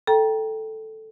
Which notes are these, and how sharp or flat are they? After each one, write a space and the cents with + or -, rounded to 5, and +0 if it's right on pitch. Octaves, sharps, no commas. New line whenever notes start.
A4 +0 G5 +0 A#5 +25